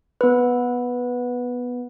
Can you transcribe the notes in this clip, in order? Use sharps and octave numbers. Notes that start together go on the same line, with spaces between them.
B3 B4